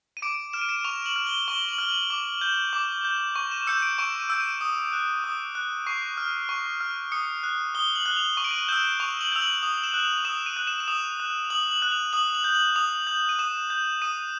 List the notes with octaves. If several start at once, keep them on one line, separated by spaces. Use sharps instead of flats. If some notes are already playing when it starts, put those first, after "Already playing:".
D#7
D6 D7
F6 E7
D#7
D7
D#7
C#6 F7
F#7
F6
G7
C#6 G7
F#7
F6
F#7
D6
G6
D6
G6
C#6
E7
E6 G6 C#7
D7
C#6 D7
D#7
E6 G6
D#7
D#6
F#6
D#6
F#6
C#6 C7
F6
C#6
F6
D#6 C#7
F#6
D#6 G7
F#7
F#6
F7
C#6 D#7
D7
D#7
E6 G6 E7
C#6 F7
F#7
E6 G6 F7
F#7
D#6 F7
E7
F#6
F7
F7
D#6 E7
D#7
F#6
E7
E7
D#6 F7
F#6
F7
D#6 F#7
F#7
F#6
F7
D#6 F#7
F7
F#7
G6
F#7
D#6 F7
G6
D#7
D#6 E7
G6
D#6 D#7